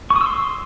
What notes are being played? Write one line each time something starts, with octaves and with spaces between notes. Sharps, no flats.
C#6
D#6
E6
C6